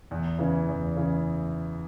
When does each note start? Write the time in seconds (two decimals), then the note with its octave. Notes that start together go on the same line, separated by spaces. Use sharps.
0.11 E2
0.39 C#3 E3
0.68 E2
0.96 C#3 E3